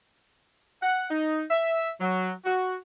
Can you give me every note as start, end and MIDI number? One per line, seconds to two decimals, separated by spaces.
0.82 1.08 78
1.10 1.43 63
1.50 1.90 76
2.00 2.31 54
2.45 2.76 66